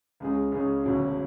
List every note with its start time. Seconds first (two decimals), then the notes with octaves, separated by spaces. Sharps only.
0.20 C#2 C#3 G#3 C#4 G#4
0.51 C#2 C#3 G#3 C#4 G#4
0.83 E1 D2 C#3 F#3 C#4